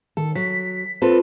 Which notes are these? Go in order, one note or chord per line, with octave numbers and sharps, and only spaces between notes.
D#3 A4
F#3 B6
C4 F4 A4 B4